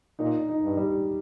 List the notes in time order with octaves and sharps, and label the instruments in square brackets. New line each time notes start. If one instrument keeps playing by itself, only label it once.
[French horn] A#2 [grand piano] D#4
[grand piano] D#4
[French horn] G2
[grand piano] G3